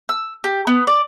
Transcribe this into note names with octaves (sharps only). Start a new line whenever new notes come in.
E6
G4
B3
D5